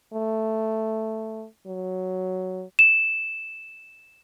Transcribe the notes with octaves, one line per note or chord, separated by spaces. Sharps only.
A3
F#3
E7